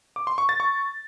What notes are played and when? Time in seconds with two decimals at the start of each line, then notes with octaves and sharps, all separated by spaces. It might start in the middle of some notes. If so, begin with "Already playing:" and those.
0.16 D6
0.27 C6
0.38 C#6
0.49 A6
0.60 C#6